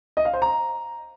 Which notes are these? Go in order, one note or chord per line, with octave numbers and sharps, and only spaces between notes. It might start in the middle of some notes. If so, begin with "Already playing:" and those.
D#5
F5
C5
A#5